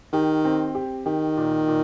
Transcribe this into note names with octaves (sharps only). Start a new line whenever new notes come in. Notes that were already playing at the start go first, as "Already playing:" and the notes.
D#3 G4
C4
G4
D#3 G4
A#2
A#2